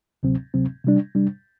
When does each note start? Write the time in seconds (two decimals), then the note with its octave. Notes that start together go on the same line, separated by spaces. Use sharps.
0.23 D2 C3 F#3 C4
0.54 D2 C3 F#3 C4
0.85 C3 G3 D4
1.15 C3 G3 D4